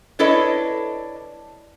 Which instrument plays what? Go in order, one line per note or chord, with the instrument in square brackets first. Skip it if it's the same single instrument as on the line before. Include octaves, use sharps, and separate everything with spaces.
[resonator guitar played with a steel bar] D4 E4 A4 B4 C#5 D#5